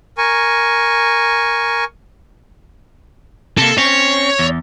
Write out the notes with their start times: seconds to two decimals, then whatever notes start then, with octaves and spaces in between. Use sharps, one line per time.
0.18 A#4 G#5 C#6
3.58 C3 A#3 A4
3.78 C4 C#4 C#5
4.39 E2